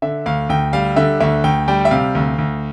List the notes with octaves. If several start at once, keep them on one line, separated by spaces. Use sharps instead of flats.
D3 E5
D2 F5
D2 G5
G3 F5
D3 E5
D2 E5
D2 G5
G3 G5
E5
C3 F5
D2
D2